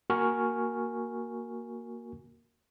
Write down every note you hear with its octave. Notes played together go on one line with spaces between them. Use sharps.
A#3 F#4 A#4 G#5 C#6 F6